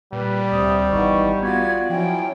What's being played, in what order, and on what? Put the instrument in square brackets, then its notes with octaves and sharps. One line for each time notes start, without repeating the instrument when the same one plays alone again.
[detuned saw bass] A#2 [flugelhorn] G3 [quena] B4
[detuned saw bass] D2 [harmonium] C3 C4 [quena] D#6
[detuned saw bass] G#1 [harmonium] E3 B3 D#4 [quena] C#6
[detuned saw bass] B3 [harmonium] F4 F#4 D5 [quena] G#6
[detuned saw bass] F3 [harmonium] F#3 C#4 E4 [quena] G5